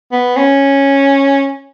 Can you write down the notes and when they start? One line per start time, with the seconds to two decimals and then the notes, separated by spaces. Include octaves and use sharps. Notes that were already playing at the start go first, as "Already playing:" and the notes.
0.12 B3
0.36 C#4